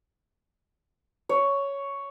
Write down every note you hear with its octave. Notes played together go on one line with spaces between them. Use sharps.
C#5